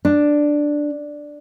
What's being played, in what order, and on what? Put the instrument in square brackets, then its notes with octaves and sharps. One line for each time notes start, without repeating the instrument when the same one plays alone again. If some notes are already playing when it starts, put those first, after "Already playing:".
[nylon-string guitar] D4